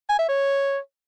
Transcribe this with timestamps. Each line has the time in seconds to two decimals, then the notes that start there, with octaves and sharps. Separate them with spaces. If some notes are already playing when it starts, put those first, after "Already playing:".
0.09 G#5
0.19 E5
0.29 C#5